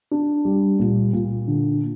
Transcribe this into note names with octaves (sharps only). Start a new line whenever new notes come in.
D4
G3
A#2
A#2
D3